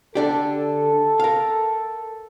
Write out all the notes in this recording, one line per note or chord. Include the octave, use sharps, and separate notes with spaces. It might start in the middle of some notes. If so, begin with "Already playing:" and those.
D3 D4 G4 A4
A#4 F5